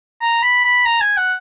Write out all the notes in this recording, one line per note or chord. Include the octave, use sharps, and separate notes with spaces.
A#5
B5
B5
A#5
G#5
F#5